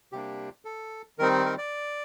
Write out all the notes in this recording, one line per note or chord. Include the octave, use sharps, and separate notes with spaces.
C3 G3 A#3 D4 G4
A4
D#3 G3 C4 D#4 A#4
A#4
D5